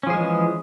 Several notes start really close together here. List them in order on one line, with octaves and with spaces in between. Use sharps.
C#4 F3 G#4 G#3 E3